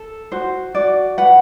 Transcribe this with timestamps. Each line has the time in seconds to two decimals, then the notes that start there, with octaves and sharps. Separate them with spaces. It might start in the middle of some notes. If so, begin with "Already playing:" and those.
Already playing: A4
0.32 F#4 C5
0.75 F#4 D5
1.18 B4 F#5